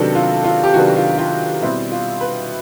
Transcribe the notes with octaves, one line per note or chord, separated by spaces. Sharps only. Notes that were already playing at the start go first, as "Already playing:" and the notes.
Already playing: C3 D#3 F#3 B3 D4 A4
F4
F4
G4
C3 D#3 F#3 B3 D4 F#4
F#4
F4
F4
B2 G3 C4 E4
F4
B4